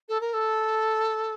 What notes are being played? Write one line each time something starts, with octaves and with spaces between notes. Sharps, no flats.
A4
A#4
A4